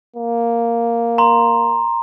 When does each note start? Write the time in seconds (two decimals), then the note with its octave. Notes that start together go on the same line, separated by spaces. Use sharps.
0.16 A#3
1.18 A#5 C6